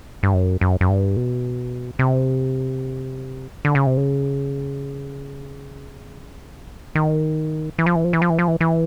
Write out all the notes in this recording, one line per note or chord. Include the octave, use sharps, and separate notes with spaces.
G2
F#2
F#2
F#2
G2
B2
C3
D3
C#3
C3
C#3
D#3
E3
F3
E3
F3
E3
F3
E3
F3
E3
E3